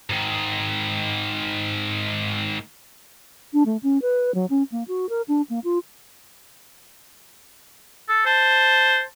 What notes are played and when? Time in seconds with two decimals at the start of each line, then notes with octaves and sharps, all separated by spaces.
0.10 G#2 D#3
3.53 D4
3.66 A3
3.83 C#4
4.02 B4
4.35 F#3
4.50 C#4
4.72 A#3
4.88 F#4
5.09 A#4
5.28 D4
5.50 A#3
5.64 F4
8.09 A4
8.26 C5 A5